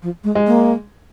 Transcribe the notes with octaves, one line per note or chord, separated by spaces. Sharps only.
F3
G#3
G#3
A#3